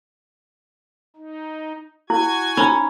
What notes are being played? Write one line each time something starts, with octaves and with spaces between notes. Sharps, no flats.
D#4
E4 F#4 G#5 G#6
C#4 D#4 A#5 B5